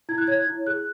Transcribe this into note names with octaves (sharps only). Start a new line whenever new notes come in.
E4 G#6
F#6
C#5 G#6
E4
G#4 F#6